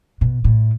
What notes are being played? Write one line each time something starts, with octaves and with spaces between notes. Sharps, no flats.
B2
A2